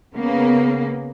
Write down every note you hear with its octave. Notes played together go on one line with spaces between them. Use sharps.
C#3 A#3 B3